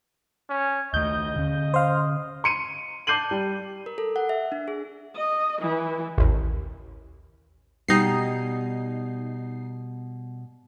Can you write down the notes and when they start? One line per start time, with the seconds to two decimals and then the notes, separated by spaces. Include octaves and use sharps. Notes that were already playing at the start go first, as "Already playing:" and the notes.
0.50 C#4
0.94 D#2 A3 D#5 G6
1.36 D3 C#4
1.74 C5 F5
2.44 C6 C#7 D#7
3.07 A5 D6 G6 C7 D#7 F#7
3.31 G3
3.86 A#4
3.98 A4
4.16 F#5
4.29 E5
4.52 D4
4.68 G#4
5.15 D#5
5.62 E3
6.18 A1 D#2
7.88 B2 G3 D#4 C7